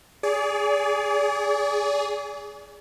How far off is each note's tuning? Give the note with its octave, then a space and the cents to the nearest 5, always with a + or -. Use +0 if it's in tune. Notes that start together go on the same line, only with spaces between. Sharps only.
G#4 +0 D5 -35